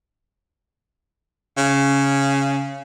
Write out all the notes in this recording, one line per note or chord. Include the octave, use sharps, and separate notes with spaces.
C#3